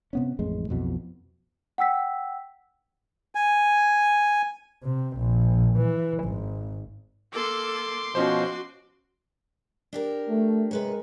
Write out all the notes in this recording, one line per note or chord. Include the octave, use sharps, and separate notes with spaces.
C3 B3 C#4
A1 F2 G#3
B1 F2 B2 E3
F#5 G5 E6 B6
G#5
C3
A#1
E3
G#1
A#3 A4 C6 D6
B2 F3 C#4 F#4 C5
D4 G4 A#4
A3
C3 G#3 A#4 B4 C#5